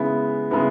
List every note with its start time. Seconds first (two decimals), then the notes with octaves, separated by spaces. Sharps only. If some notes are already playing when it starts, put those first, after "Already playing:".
Already playing: C#3 G#3 B3 E4
0.51 C#3 G#3 B3 E4